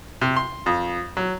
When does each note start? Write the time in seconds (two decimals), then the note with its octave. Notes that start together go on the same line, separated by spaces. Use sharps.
0.21 C3
0.37 C6
0.66 F2
1.17 F#3